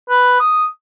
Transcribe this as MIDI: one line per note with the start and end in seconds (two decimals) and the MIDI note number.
0.09 0.37 71
0.40 0.65 87